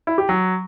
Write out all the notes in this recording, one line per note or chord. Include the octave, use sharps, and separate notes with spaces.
E4
G4
F#3